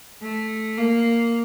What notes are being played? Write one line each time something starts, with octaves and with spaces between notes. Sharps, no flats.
A3
A#3